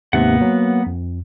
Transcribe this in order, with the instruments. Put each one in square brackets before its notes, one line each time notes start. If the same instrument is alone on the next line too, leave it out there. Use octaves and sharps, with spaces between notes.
[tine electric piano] D#2 G#2 C3 [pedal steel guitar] A#3 B3 F#5
[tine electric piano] F#3
F2